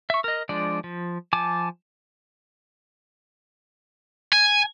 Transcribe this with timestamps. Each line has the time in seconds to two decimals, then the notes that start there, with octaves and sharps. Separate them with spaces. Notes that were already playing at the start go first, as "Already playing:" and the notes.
0.10 E5 C#6
0.24 A#4 D#5
0.49 F3 G#3 D4 D5
0.84 F3
1.33 F3 G#5 A5 D6
4.33 G#5